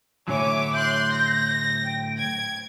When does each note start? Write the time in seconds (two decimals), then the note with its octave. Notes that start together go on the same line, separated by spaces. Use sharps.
0.28 A2 D3 F#3 C#5 E5 G#5 D6
0.74 C6 F#6 G6
1.11 A#6
1.84 G5
2.18 G#6